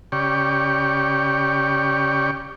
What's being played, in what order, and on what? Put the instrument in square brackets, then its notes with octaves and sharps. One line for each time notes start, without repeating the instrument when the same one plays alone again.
[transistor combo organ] C#3 G4 D5 C#6